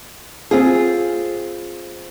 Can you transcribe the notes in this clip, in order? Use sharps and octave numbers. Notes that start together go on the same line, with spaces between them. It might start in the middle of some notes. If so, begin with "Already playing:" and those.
C4 F4 G#4